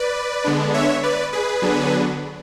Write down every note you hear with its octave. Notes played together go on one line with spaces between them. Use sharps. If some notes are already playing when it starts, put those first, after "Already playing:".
Already playing: B4 D5
D3 G#3 B3 D4
C#5 E5
B4 D5
G#4 B4
D3 F#3 B3 D4